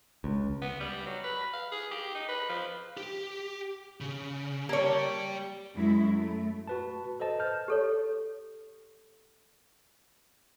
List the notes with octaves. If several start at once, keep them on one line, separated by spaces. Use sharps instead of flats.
C#2
B3
G3
F#3
B4
F5
G#4
G4
D#4
B4
F3
G4
C#3
A#3 G4 C#5 D5
F#2 G#3 E4
A3
F#4 B4 A5
A4 B4 C5 D#5 A5
A5 F6 G6
G4 A4 C#5